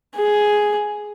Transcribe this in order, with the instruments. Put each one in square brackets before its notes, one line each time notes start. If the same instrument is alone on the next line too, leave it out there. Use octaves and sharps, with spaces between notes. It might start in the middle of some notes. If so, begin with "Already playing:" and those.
[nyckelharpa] G#4